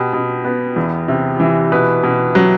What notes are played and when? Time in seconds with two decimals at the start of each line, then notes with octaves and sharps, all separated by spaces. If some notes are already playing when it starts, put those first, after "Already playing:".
Already playing: B2 G4
0.13 B2
0.45 B3
0.76 E2
1.08 C3
1.40 E3
1.72 B2 B4
2.03 B2
2.35 F#3